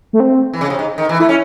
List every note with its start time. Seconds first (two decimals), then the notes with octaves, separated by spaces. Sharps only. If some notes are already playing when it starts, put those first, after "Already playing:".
0.13 A3
0.20 C4
0.54 E3
0.61 C#3
0.70 C3
0.79 G#2
0.98 D#3
1.09 E3
1.20 A3 E4
1.29 C#4